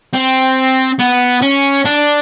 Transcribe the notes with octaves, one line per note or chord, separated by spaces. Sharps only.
C4
B3
C#4
D4